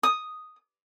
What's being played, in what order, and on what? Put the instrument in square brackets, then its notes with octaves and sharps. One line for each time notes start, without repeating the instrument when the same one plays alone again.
[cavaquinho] D#6